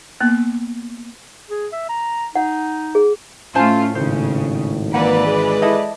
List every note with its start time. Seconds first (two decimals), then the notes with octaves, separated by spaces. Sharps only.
0.21 A#3 B3
1.50 G#4
1.73 E5
1.89 A#5
2.36 D#4 F#5
2.95 G#4
3.55 A2 A3 C#4 F4 C5 G#5 A5
3.95 G#1 C#3 C5
4.94 E3 A#3 B4 D5 F#5
5.25 G#3
5.62 E4 A4 D#5